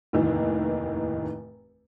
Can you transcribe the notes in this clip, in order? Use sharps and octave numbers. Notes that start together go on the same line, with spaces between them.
F1 D#2 A2 D#3 E3